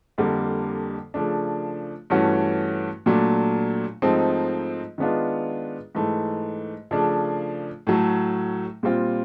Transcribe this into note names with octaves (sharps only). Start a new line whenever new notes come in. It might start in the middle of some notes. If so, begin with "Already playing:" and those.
F2 D3 G3 A#3
C#3 F3 A3 D4
G2 E3 A3 C#4 F#4
A#2 F#3 A3 D4
G#2 F3 A3 C4 D#4
D#3 G#3 B3 D4 F4
G#2 E3 A3
C#3 F3 A3 D4
A2 F#3 A3
A#2 G3 C4 F4